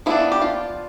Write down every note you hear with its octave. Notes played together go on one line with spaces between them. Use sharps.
F3 B3 D4 E4
G4
F4